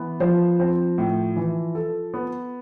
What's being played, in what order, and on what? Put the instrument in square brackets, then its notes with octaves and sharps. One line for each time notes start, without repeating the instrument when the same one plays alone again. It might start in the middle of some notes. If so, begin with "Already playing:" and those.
Already playing: [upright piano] E3 B3
[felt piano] F3 [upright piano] C5
[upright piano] C4
A2
E3
A4
B3